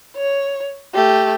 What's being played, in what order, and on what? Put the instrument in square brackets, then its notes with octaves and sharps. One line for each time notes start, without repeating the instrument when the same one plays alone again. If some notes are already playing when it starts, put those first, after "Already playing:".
[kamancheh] C#5
A3 G4